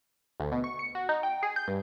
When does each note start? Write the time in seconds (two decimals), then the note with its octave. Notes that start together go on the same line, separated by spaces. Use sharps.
0.40 D2
0.52 B2
0.64 C#6
0.79 C#7
0.95 F#4
1.09 D#4
1.23 G5
1.43 G#4
1.56 G6
1.68 G2